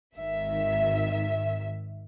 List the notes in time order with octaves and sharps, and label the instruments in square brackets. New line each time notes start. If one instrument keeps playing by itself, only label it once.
[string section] G#1 D#3 E5